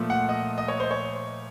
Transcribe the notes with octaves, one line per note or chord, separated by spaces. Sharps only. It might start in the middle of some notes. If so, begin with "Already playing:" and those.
Already playing: A#2 F3 A3
F#5
D#5
D#5
C#5
C5
C#5